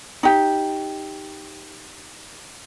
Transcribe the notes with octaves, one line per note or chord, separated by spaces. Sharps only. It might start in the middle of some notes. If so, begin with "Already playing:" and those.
D#4 G4